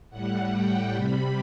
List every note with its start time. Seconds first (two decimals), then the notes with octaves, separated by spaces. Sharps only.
0.10 A2 G3 F#5
0.52 G5
0.93 C3 G3 B5